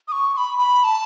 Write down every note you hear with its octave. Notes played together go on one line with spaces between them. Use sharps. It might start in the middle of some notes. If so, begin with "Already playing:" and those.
D#6
C#6
C#6
B5
B5
A5